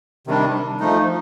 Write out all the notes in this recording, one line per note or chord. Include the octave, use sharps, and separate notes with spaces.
C3 D#3 G3 D4
F3 A3 D#4